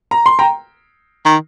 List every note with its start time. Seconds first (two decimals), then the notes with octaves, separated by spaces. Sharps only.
0.11 A#5
0.26 C6
0.39 G5 A#5
1.26 D#3